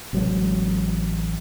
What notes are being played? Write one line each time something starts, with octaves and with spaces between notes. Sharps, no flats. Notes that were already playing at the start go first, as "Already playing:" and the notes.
A1 C3 F#3 G#3